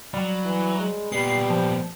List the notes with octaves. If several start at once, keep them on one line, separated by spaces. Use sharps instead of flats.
F#3 G3
E3
G#3
A#2 G3 B3 C7
F3